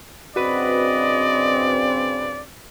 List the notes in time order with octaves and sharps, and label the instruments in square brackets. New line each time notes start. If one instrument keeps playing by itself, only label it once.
[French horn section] G2 C#3 C4 [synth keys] F#4 B4 [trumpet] D5 [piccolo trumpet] D#5